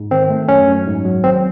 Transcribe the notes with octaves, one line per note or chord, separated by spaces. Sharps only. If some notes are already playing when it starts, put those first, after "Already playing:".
Already playing: G#2
D#3 C4
A3
F#2 C#4
F#2
G#2
F#3
G#1 C4